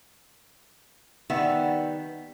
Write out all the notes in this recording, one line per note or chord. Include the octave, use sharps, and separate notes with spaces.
D#3 G3 B3 E5